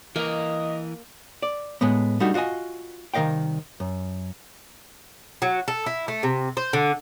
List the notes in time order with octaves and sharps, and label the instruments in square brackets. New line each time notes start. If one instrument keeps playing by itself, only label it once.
[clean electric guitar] E3 A#4 [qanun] A#3 [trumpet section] D#5
[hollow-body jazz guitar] D5
A2 G#3 B3
G3 A3 D4 D#4 F#4
F4 F#4 D5 D#5 G#5
C2 D#3 A#4 D#5 F5 G5
F#2
[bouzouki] F#3
A4
E4
A3
C3
C5
D3